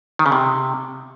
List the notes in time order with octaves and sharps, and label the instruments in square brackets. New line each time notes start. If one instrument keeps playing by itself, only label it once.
[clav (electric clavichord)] D#3
C#3
C3